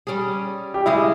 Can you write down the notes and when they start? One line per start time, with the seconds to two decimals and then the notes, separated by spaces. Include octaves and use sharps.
0.07 G3 C#4 G#4
0.74 G4
0.86 C#3 G#3 C#4 E4 G#4